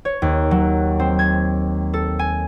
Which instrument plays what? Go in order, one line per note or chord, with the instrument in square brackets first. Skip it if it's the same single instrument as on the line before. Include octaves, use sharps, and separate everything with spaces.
[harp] C#5
D#2
F#3
C4
G#6
A4
G#5